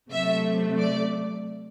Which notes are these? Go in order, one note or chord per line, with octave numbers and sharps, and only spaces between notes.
C3 F#3 A3 E5
D5